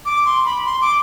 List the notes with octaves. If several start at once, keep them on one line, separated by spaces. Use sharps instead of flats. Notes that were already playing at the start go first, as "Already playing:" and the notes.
D6
C6
B5
C6
D6